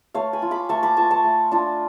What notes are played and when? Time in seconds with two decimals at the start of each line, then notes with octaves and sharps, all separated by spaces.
0.14 A3 C#5 F5
0.33 G#5 B5
0.42 F4
0.51 B5 D6
0.69 A3 A5 C#6
0.83 B5 D6
0.97 F4 A5 C#6
1.11 A5 C#6
1.24 A3
1.51 D4 F4